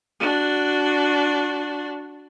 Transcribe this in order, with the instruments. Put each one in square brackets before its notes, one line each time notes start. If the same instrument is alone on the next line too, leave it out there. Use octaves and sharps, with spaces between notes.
[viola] D4 F#4